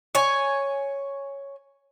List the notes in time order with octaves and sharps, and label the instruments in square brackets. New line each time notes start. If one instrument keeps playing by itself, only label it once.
[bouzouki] C#5 G#5